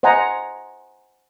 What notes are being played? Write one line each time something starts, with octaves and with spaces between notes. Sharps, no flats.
C5 D#5 F#5 G#5 A#5